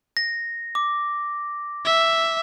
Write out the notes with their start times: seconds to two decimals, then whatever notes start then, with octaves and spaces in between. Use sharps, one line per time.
0.17 A#6
0.75 D6
1.85 E5